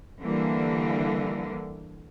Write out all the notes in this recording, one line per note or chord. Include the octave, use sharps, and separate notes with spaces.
D3 E3 G3 A#3